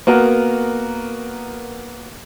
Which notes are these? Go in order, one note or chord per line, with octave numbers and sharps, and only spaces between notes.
A#3 B3 F#4 A#4